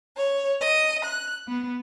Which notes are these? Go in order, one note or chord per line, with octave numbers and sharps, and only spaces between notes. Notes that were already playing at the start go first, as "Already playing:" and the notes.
C#5
D#5
F#6
B3